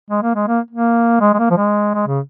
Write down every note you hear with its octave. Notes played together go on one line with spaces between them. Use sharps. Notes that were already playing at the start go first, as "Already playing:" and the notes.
G#3
A#3
G#3
A#3
A#3
G#3
G#3
A#3
F3
G#3
G#3
C#3